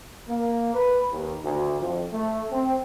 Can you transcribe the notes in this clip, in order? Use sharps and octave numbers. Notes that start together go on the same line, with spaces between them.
A#3
B4
D#2
D2
F2
A3
C4